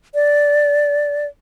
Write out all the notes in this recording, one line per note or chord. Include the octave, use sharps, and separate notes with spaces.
D5